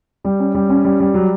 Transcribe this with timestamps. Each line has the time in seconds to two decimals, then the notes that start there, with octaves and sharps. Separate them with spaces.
0.25 G3
0.40 C#4
0.55 G3
0.69 C#4
0.84 G3
1.00 G3
1.14 F#3